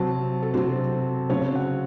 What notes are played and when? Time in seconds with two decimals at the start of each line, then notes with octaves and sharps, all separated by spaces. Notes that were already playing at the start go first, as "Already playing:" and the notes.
Already playing: C3 F#3 C4 A5
0.43 A4
0.54 C3 F#3 C4 C5
1.30 C#3 F#3 C4 C#5
1.55 F#5